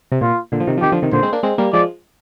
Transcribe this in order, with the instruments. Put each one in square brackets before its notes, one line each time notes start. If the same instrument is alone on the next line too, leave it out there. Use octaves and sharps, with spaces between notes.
[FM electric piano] C3
[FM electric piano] A#2 [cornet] F4
[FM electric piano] A#2 D3
F3
C3 D#3
F3
[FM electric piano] C3 D#3 [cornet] G4
[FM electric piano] D3 F3
C3 D#3
[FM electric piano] A#2 D3 [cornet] C5
[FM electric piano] G#3 C4
A#3 D4
G#3 C4
G3 A#3
[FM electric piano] F3 G#3 [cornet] D5